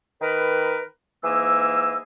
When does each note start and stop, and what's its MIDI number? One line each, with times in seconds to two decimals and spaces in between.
0.21 0.83 51
0.21 0.83 70
0.21 0.83 71
1.24 1.97 44
1.24 1.97 52
1.24 1.97 58
1.24 1.97 68
1.24 1.97 88